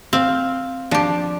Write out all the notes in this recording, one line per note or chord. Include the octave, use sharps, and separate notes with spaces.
C4 F5
F3 D4 G4